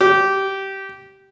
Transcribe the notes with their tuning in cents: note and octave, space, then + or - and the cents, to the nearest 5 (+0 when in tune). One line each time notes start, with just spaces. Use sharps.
G4 -15